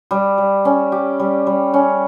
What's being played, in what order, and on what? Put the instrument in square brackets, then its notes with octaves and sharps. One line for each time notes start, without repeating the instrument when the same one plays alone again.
[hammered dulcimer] G3
G3
C#4
G4
G3
G3
C#4